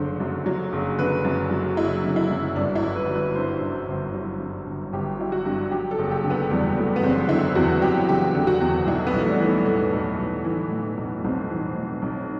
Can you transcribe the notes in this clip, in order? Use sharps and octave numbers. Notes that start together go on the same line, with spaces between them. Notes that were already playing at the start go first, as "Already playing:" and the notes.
Already playing: F#1 D3 C5
F#2
F#3
F#1
D3 B4
F#2
F#3
F#1 E4
D3
E4
F#2
G1 D4
E4
G1
B4
F#3
B4
G2 C5
G1
G1
F#3
G2
G1
G1 G4
F#3 E4
F#4
G2
F#3 G4
A4
F#1
G4
D3
B3
E2 G3
F#3 A3
B3
F#1 C4
D3 E4
E2 F#4
F#3 G4
F#1 G4
D3
F#4
E2
B1 E4
B3
B1
A3
G3
E3
A3
A2 A3
B1
B1
E3
A2
B1
B1 C4
E3
A2
B1